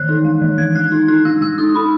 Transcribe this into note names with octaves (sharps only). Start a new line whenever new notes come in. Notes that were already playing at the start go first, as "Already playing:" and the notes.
Already playing: D#3 E3 F#6
D#4
G#3
E3
G#3 G#6
G#3 F#6
D#4
D#4 F#6
G#3 E6
G#3 E6
D#4 D#6
D#4 B5